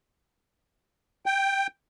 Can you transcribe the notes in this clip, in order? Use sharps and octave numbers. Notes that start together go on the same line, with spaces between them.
G5